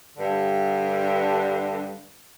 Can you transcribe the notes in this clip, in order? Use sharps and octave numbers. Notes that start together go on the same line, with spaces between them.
G2 D3